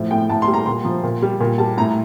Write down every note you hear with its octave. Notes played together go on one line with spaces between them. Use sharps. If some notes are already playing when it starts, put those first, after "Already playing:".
Already playing: A2 F3
A2 G5
A2 A5
C6
G3
A#5
A#2 C6
F3
A#2
G3
A#2
G3 A5
A2 A#5